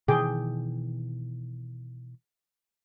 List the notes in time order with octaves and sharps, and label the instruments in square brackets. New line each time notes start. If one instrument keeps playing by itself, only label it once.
[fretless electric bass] B2 D#3 E3 [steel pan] G#4 G5 D6